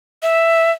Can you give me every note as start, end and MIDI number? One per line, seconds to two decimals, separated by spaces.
0.23 0.71 76